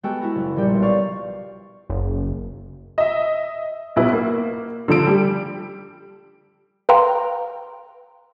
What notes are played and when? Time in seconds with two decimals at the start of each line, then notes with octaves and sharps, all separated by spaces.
0.03 G#3 B3 F#4 G4 A4 G5
0.19 E4 F#4 A#5 B5
0.35 F#1
0.56 A#1 G3 G4 G6 C#7
0.70 B1 C6
0.82 D5 F5 C#6
1.90 F#1
2.98 D#5 E5
3.96 B1 E4 B4
4.13 A#3
4.88 D3 F3 A4 D7
5.07 G3
6.89 B4 F5 G5 A#5 C6